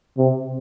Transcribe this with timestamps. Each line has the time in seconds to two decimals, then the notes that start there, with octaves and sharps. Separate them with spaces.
0.18 C3